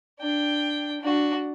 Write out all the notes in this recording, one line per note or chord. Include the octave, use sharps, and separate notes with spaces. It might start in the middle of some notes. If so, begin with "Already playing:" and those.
D4 G5
D4 F#4